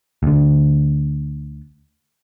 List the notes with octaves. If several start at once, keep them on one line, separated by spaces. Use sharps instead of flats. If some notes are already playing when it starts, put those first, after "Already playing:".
D2 D3